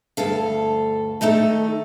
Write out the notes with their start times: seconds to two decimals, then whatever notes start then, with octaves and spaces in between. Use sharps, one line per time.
0.17 D2 G2 A4 F5
1.21 D#3 A3 D#4 A4